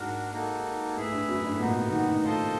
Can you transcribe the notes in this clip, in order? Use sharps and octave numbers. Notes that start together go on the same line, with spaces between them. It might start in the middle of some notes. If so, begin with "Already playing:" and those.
Already playing: G#2 D4 F#4 A#4
A#3 D#4 F#4 A4
A2 E4 G#4 B4 E5
G2
F#2
G2
A2
A#2 B3 D#4 F#4
B2
D#3
D#3
F4 A4 C5 D#5